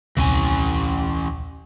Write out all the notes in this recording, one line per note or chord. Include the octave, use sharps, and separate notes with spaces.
D#1 C2 E3 C#4 G#5